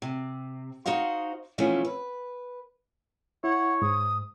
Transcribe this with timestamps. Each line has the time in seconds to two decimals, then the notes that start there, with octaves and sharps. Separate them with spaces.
0.02 C3
0.86 D#4 F#4 C5 D#5 F5
1.58 B2 E3 F3 A3 C#4
1.85 B4
3.44 E4 C#5 F#5
3.82 G#2 D#6